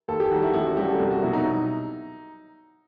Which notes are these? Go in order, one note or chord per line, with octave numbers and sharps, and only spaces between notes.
D#2 A4
G4
D#3 G3 F#4
E4
A1 E4
F#4
G2 F#3 G4
A4
C2
F#4
B2 F#3 E4
D#4